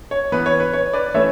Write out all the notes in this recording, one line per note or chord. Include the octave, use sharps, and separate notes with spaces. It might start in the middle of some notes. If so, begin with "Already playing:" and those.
C#5
E3 B3 B4
C#5
B4
C#5
B4 D5
E3 A3 C#4 C#5 E5